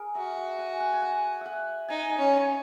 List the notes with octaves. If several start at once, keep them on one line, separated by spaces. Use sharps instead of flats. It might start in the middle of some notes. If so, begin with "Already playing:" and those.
Already playing: G#4 A#4
F#4 E5
F#5
G#5
F#5
G#5
F#5
E5 F#5
D#4 G#5
G#5
C#4
G#5